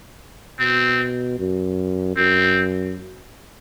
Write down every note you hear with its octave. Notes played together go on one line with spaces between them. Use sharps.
B2 C4
F#2
F#2 C4